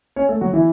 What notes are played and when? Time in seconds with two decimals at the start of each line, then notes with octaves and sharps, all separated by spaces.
0.16 C#4 C#5
0.29 A3 A4
0.41 F#3 F#4
0.54 E3 E4